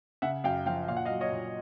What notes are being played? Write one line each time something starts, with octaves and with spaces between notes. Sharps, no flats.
C#3 E5 F#5
F#2 F5 G5
F3 F5 G5
A#2 F5
F#5
D#5 F5
F#3
C#5 D#5
A#2